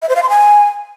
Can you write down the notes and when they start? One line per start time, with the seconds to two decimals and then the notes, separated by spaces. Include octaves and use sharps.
0.02 E5
0.09 C5
0.16 F5
0.22 C6
0.29 G#5